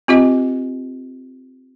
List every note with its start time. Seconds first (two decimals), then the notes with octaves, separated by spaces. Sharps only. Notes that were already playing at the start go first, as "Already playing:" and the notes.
0.08 C4 F4 G4 D#5